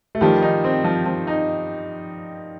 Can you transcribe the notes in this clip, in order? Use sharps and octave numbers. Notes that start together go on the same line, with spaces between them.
A3
D#3 F3 G3
D#4
C4
F3
F3
D#4